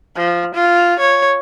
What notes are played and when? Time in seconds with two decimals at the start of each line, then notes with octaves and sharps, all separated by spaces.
0.16 F3
0.55 F4
0.99 C#5